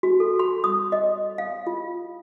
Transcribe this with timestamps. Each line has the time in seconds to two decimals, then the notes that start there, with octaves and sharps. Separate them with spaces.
0.03 F#4
0.20 A4
0.39 C6
0.64 D#6
0.92 D#5
1.38 F5
1.67 F4